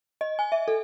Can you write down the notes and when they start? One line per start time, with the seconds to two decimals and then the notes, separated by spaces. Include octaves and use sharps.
0.21 D#5
0.39 G#5
0.52 E5
0.68 A4